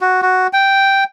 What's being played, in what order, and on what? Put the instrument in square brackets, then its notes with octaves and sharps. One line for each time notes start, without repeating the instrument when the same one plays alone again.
[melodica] F#4
F#4
G5